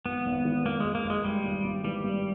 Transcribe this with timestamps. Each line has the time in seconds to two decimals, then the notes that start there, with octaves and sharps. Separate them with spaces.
0.06 G#1 B3
0.26 G#1
0.45 E3
0.65 G#1 A#3
0.80 G#1 G#3
0.95 A#3
1.05 G#1
1.10 G#3
1.24 G#1 G3
1.45 G#1
1.64 G#1
1.84 E3 G3
2.04 G2